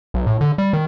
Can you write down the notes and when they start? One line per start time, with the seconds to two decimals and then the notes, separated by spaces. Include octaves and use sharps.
0.14 B1
0.27 A2
0.41 D3
0.58 G3
0.73 D#3